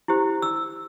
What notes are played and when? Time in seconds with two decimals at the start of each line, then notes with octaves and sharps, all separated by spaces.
0.08 E4 G4 C5
0.42 E6